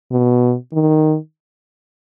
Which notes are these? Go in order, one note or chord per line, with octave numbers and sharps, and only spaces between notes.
B2
D#3